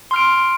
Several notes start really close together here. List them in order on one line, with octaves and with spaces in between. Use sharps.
C6 F6 D7